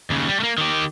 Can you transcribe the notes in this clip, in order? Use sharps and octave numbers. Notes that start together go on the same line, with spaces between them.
D#2 C#3
G3
A3 A#3
D#3 G4